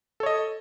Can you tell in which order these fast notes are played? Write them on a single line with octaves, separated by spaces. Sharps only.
A4 C#5 D#5